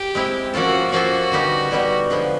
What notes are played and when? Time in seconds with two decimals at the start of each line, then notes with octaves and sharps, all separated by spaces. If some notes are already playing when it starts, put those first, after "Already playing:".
Already playing: G4
0.15 G#3 C4 E4
0.54 F3 A#3 C#4 F4 F#4 A4
0.92 F3 A#3 C#4 F4 F#4 A4
1.32 D3 G3 B3 D#4 G4
1.71 D3 G3 B3 D#4 G4
2.10 D3 F3 G#3 B3